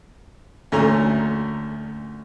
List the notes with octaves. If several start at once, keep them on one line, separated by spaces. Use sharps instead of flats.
D2 A#2 A3 C#4 A#5